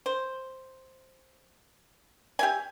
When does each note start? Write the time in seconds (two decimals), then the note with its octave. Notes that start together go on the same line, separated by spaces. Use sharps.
0.06 C5
2.39 G4 E5 G#5